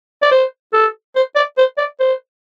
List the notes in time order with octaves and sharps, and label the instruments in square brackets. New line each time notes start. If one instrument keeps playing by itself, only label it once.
[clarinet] D5
C5
A4
C5
D5
C5
D5
C5